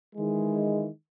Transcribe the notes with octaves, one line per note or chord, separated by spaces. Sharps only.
D#3 E3 G#3